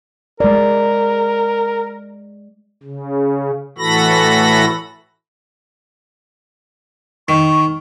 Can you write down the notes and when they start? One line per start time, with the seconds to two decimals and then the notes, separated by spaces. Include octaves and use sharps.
0.40 G#3 A#4 D5
2.83 C#3
3.78 A2 E3 F#4 A4 B5 A#6
7.29 D#3 C#6